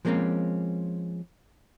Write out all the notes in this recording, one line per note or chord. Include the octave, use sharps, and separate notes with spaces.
F3 G#3 A#3 C4 C#4